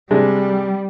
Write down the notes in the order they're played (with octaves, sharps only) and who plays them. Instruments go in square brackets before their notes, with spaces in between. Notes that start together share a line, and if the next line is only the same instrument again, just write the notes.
[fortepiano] C3 G#3 D4 [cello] G3